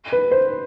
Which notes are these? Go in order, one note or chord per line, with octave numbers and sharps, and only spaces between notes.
B4
C5